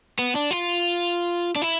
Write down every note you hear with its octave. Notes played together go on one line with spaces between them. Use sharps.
B3
D4
F4
D4
E4